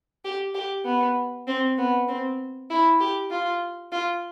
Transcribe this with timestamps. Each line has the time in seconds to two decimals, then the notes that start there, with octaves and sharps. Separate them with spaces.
0.25 G4
0.55 G4
0.85 B3
1.47 C4
1.78 B3
2.08 C4
2.70 E4
3.00 G4
3.31 F4
3.92 F4